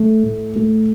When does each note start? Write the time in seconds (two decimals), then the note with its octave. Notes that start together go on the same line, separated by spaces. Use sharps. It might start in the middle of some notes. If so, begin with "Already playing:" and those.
Already playing: A3
0.23 A2
0.56 A3